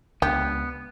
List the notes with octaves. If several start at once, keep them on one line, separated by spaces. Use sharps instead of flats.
C#2 B3 D4 G4